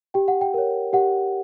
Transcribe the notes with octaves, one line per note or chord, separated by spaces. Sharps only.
G4 G5
F#5
G5
A#4 C#5
G4 F#5